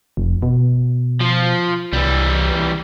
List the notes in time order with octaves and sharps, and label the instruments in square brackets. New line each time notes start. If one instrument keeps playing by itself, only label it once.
[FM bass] F1
B2
[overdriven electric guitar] F3
[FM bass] C2 [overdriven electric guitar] E3 G3